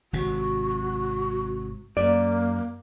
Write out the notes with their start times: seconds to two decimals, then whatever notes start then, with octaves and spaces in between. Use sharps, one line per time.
0.13 G#1 C3 F#4
1.97 F#2 A#3 D5